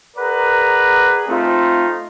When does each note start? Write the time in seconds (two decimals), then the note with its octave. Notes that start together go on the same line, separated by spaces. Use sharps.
0.17 G#4 A#4 B4 D5 F#5 A#5
1.28 A3 C4 D#4 F4